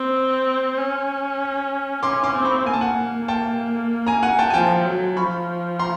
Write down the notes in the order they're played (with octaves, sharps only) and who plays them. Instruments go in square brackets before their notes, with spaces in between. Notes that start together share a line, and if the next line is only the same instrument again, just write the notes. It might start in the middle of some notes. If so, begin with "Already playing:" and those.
Already playing: [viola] C4
C#4
[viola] C#4 [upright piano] C6 D6
[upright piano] C6 D6
[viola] C4
[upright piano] B5 C#6
[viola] A#3 [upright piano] G#5
[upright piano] A5
F#5 G#5
G5 A5
G#5 A#5
F#5 G#5
G5 A5
G#5
[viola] F3 [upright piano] G5 A5
[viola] F#3
[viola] F3 [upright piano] B5 C#6
[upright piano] A#5 C6